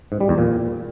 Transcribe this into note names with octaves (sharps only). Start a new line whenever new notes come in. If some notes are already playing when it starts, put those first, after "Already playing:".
G#2
G3
E2
A#2